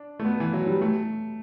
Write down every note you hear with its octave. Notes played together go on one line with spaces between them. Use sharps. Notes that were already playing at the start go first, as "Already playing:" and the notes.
Already playing: D4
A3
B3
E3
F#3
G3
A3